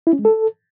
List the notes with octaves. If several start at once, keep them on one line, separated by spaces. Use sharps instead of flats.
E4
C#4
G#3
A4